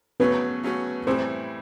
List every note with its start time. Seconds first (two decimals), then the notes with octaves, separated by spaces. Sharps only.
0.20 C#3 F#3 A3 B3 C#4 F#4 B4
0.63 C#3 F#3 A3 C#4 F#4
1.07 A2 E3 G3 C4 C5